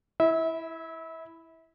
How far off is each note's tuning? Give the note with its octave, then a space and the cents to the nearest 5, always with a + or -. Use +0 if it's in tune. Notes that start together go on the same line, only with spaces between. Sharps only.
E4 +0 E5 -30